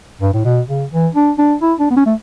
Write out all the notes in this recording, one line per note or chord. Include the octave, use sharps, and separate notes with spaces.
G2
A2
B2
C#3
E3
D4
D4
E4
D4
B3
C#4
A3